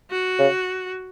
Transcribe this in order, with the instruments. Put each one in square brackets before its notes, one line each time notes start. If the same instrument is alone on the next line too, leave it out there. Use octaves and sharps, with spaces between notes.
[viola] F#4
[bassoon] C#3